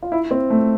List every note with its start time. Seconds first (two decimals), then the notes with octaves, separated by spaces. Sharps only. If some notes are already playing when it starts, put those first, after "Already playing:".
0.03 F4
0.12 E4
0.31 C4
0.50 A3